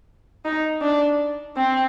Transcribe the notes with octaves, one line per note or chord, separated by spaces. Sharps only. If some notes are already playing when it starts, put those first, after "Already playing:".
D#4
D4
C4